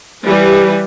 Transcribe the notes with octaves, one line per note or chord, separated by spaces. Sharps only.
E3 G3 B4